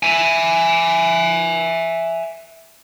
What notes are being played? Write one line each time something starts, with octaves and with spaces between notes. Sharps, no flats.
E5 G#5